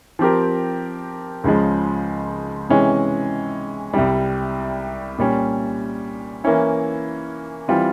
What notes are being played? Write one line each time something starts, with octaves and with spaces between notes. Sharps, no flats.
F3 C4 G4 A#4
C#2 C#3 F3 G#3
C3 E3 G#3 C#4
C2 C3 G3
A#2 G3 C#4
E3 A#3 C#4 E4
E3 G3 C4 F4